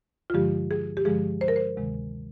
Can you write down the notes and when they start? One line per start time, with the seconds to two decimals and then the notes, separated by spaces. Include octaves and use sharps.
0.30 F4
0.34 G2 D3 F3 G#3 G4
0.71 G#4
0.97 G4
1.05 G2 D3 F3 G#3 G#4
1.41 C5
1.48 A#4
1.56 C5
1.77 D2 C3 D#3 G#3